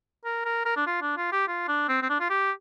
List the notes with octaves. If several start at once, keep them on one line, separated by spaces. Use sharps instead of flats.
A#4
A#4
A#4
D4
F4
D4
F4
G4
F4
D4
C4
C4
D4
F4
G4